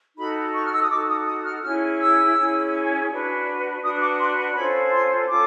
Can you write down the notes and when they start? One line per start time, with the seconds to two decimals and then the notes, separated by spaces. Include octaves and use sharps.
0.16 D#4 F#4 A4 B5
0.54 C#6
0.66 F6
0.74 E6
0.82 D#6
0.90 D#4 F#4 A4 D6
1.08 D#6
1.26 D#6
1.45 F6
1.63 C#4 E4 G#4 F6
1.99 E6
2.36 C#4 E4 G#4
3.09 D4 F#4 B4
3.82 D4 F#4 B4 D#6
4.01 D6
4.19 C6
4.37 B5
4.55 C#4 F4 A4 C5 B5
4.92 C6
5.28 C#4 F4 A4 D6